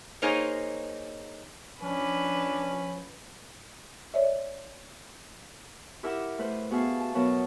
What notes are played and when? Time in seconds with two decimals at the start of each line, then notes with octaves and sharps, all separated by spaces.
0.22 A#3 D#4 G#4 C5 C#5 D#5
1.82 F3 C#4 D4 B4
4.14 C#5 D5 E5
6.03 E4 G4 A#4 E5 F#5 D6
6.38 A3 B4 C5
6.71 B3 F#4 G#4 E5 F5 A5
7.00 A5
7.14 B2 F#3 B3 A#4 F#5 A5